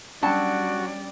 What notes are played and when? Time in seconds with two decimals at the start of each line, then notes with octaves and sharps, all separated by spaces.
0.22 F#3 G3 C#4 D4 F#4 D5 G5 A5